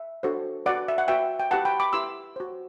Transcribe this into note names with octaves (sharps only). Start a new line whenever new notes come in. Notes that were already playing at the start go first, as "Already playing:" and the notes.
Already playing: E5
D4 F#4 A4 C5
F#4 B4 D5 F#5
E5
F#5
F#4 B4 E5 G5
G5
E4 G4 B4 F#5 A5
G5 B5
B5 D6
E4 G4 B4 C6 E6
F#4 C5